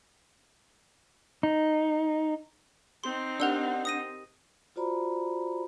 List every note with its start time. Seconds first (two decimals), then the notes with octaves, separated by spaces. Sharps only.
1.43 D#4
3.04 C4 D#4 C6
3.40 D4 G4 A#4 F#5 E6
3.85 D#6 A#6 D#7
4.76 F4 F#4 C5 D5 A#5 B5